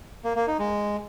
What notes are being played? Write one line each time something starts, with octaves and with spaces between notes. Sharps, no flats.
A#3
A#3
D#4
G#3